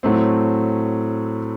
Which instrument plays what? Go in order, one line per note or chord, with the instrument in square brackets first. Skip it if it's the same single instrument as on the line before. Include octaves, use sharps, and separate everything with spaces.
[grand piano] A2 F#3 A3 C4